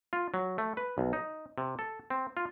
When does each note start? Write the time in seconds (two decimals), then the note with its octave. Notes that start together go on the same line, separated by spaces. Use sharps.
0.13 F4
0.34 F#3
0.58 A3
0.77 B4
0.98 B1
1.13 D#4
1.58 C3
1.79 A4
2.10 C4
2.37 F4